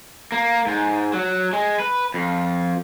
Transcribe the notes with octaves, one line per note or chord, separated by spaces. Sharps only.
A#3
G#2
F#3
G#3
B4
F2